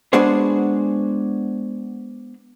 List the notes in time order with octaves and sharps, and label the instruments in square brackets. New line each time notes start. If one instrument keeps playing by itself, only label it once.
[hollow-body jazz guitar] G#3 B3 D4 F#4 G#4 C5